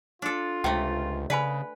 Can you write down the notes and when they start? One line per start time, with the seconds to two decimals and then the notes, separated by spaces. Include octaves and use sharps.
0.22 D4 F4 A4
0.64 C#2 C3 A3 G5
1.30 C#3 B4 D5 G#5 B5